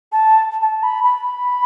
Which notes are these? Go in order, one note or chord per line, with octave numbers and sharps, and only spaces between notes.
A5
A5
B5
B5